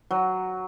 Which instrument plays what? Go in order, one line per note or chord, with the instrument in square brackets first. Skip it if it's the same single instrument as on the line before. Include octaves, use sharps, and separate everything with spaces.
[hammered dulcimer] F#3